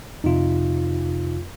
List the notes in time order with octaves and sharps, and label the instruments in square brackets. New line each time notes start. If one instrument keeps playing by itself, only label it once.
[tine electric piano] F2 F4 [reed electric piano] C3 D#4